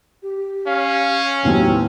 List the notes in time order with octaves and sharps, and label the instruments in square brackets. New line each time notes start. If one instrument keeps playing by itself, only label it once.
[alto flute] G4
[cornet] C#4 [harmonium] F5
[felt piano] D#2 A2 B3 [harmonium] F#3 [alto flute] C4